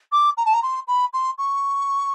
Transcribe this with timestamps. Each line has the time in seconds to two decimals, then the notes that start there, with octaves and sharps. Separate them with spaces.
0.12 D6
0.37 A#5
0.45 A5
0.53 A#5
0.62 C6
0.87 B5
1.13 C6
1.38 C#6